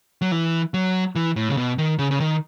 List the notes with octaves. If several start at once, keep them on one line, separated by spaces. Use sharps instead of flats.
F#3
E3
F#3
E3
A2
C#3
B2
D#3
C#3
C#3
D#3